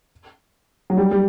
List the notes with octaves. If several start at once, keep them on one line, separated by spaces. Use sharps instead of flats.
F#3
G3
G3